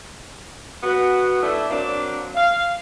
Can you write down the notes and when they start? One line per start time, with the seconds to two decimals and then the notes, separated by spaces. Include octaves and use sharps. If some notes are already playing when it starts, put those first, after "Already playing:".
0.83 B3 F#4
1.42 A3 D4 E4
1.70 F#3 A#3 C4 D4
2.35 F5